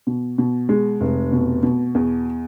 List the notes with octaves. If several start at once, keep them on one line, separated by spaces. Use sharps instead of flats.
B2
B2
G#3
F1
B2
B2
E2